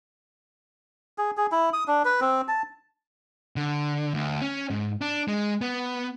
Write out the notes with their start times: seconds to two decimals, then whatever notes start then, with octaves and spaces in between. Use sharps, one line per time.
1.18 G#4
1.37 G#4
1.52 E4
1.73 D#6
1.88 D4
2.05 B4
2.21 C4
2.48 A5
3.56 D3
4.14 D2
4.41 C#4
4.70 G#2
5.01 D4
5.28 G#3
5.61 B3